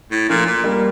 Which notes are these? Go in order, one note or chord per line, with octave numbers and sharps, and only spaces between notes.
A2
A#2 F3 A3
A#2
G3 A#3